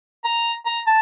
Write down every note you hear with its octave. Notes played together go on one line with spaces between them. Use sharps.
A#5
A#5
A5